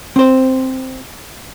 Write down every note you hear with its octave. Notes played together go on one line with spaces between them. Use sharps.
C4 C5